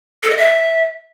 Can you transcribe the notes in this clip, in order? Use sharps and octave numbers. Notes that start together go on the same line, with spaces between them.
A4
D#5
E5